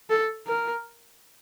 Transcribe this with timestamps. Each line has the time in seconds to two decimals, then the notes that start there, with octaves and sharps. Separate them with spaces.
0.10 A4
0.47 A#4